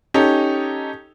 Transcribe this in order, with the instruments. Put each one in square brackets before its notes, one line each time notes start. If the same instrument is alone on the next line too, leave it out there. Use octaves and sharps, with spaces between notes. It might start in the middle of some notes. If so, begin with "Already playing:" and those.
[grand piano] C#4 D#4 G4 A4